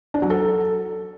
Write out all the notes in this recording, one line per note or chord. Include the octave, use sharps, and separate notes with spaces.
D4
F#3
A4